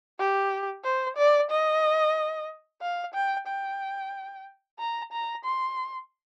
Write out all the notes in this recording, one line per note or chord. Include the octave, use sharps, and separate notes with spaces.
G4
C5
D5
D#5
F5
G5
G5
A#5
A#5
C6